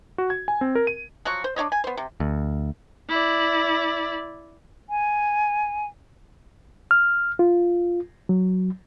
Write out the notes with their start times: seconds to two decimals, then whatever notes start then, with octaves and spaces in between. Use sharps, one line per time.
0.18 F#4
0.30 G#6
0.48 G#5
0.61 C4
0.75 A#4
0.87 D#7
1.25 F3 F#3 F#4 C#6
1.44 C5
1.56 D4 F4 C#5 D#5
1.72 G#5
1.84 B3 C5
1.97 C3
2.20 D2
3.09 E4 D5
4.90 G#5
6.91 F6
7.39 F4
8.29 F#3